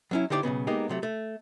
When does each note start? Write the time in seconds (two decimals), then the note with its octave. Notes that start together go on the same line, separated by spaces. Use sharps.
0.11 F#3 C#4 E4
0.30 D3 D#4 E4 G4 C5 D5
0.43 B1 E2 C#3 B3
0.67 G#3 A#3 B3 D#4 G4
0.89 C3 F#3 A3
1.03 A3